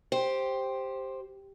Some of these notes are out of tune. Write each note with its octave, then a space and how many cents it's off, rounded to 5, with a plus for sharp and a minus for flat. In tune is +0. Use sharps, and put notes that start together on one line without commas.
G4 +0 C5 +5